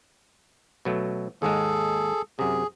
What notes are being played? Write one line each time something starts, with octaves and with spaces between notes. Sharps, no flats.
B2 F#3 A3
D#2 G#2 G#3 G#4 A4
F#2 C3 G#4